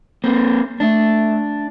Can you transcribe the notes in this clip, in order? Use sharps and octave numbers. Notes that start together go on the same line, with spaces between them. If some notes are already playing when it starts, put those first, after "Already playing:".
A#3 C4
A3 D4